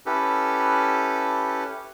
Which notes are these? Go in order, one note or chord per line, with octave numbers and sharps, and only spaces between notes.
C#4 E4 G4 A4 B4